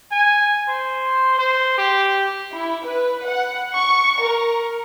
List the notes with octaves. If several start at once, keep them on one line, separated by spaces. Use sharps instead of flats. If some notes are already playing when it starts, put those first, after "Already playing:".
G#5
C5
C5
G4
E4
B4
F#5
C#6
A#4